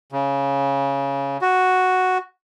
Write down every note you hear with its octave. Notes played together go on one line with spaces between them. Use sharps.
C#3
F#4